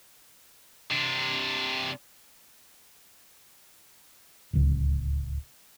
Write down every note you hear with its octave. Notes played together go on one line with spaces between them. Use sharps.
C3 D4
D1 C#2